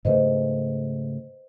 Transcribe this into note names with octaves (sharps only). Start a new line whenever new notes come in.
G#2 C#3 A3 B4 C5 D#5